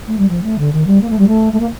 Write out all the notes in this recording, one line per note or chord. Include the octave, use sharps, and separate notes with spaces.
A3
G3
F3
A3
D3
D#3
G3
A#3
A3
G3
A3
A3
A#3